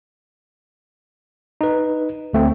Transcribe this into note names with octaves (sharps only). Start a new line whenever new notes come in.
D#4 B4
D2 A3 C4